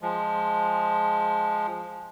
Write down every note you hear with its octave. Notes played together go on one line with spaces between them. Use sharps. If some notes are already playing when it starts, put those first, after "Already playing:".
F3 G#3